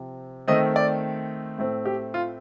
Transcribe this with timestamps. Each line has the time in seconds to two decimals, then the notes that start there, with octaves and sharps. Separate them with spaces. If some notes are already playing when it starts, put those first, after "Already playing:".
Already playing: C3 F3 C4
0.48 D#3 A3 C4 D#5
0.76 D5
1.58 A2 A3 C4
1.86 G4
2.14 F4